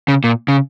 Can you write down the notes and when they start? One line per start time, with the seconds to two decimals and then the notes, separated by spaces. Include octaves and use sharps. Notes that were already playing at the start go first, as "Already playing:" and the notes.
0.08 C#3
0.24 A#2
0.48 C#3